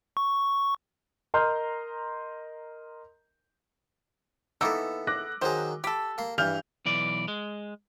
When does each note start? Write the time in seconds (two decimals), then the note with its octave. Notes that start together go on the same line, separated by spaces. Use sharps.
0.17 C#6
1.34 A#4 D#5 A#5 C6 F6 G6
4.61 E3 A#3 B3 D#4 A4 E6
5.07 D6 F#6 A#6
5.42 D#3 F#3 G#4 C5
5.84 G4 A4 B5
6.18 A#3 C6
6.38 G2 E3 F6 G6 F7
6.86 B1 E3 D5
7.28 G#3